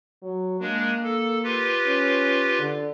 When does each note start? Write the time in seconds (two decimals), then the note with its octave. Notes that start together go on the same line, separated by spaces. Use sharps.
0.22 F#3
0.61 G#3 A#3 D4
1.04 A4
1.43 F4 G4 B4
1.87 C#4
2.59 D3